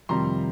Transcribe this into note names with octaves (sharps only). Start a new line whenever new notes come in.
F2 C3 D#3 G3 A#5 C6